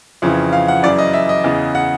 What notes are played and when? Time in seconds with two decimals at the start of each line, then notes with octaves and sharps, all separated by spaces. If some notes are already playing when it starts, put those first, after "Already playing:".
0.22 F2 C#3 E3
0.53 F5
0.68 F#5
0.83 F#2 C#3 E3 D5
0.98 D#5
1.14 E5
1.29 D#5
1.44 E2 C#3 E3
1.75 F#5